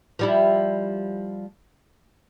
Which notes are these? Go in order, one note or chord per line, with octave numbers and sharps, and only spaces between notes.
F3 G3 E4